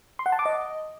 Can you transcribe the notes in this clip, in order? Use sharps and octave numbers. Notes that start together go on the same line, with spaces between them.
C6
F#5
A5
D6
D#5